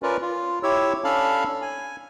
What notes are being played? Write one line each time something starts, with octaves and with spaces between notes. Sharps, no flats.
C#4 F4 A#4 B4 D5
F4
E4 G4 C#5 E6
C#4 D4 A4 F5 A5 B5
G#5